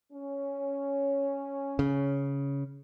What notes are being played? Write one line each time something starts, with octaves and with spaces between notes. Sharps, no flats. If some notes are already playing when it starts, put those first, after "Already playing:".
C#4
C#3